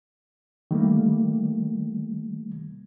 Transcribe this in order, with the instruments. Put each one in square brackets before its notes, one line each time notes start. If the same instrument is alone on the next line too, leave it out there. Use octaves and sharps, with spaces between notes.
[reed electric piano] D#3 G3 A3 A#3